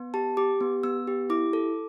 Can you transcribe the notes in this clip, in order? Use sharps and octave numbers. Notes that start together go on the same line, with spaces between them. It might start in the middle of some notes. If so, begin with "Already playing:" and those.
Already playing: B3
G4 A5
G4 D6
B3
B3 E6
G4
E4 D6
A4